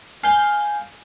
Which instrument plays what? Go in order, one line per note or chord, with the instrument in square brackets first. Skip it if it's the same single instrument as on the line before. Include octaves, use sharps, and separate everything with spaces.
[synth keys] F5 G6 [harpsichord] G#5